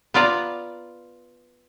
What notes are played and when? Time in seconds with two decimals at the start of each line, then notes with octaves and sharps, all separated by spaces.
0.14 B3 F4 D5 A#5